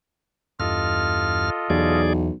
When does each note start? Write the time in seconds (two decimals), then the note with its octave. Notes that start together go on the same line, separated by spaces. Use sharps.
0.60 E2 G2 F4 A4 D#5 F6
1.70 B1 E2 G#4 D5